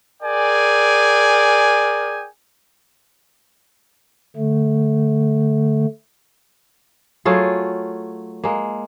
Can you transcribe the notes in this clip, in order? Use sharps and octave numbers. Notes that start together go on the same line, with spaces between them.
G#4 A#4 D5 G5 G#5
D3 A3
F#3 A3 F4 G#4
G#3 A#3